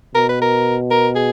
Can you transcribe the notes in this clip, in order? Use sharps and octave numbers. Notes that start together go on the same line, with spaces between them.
B2 A#4
B4
A#4
A#4
G#4